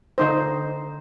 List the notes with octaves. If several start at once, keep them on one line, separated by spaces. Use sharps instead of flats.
D3 D#4 C5